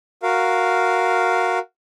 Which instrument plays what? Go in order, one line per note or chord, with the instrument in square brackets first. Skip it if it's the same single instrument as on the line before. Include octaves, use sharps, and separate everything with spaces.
[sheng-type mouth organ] F#4 A#4 F5